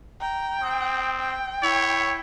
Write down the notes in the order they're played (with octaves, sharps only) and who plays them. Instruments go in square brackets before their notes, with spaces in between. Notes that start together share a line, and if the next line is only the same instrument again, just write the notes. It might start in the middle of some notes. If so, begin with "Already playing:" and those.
[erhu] G5 [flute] A#5
[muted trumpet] C4 [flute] D#6
[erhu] G5
[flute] E4 [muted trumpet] C#5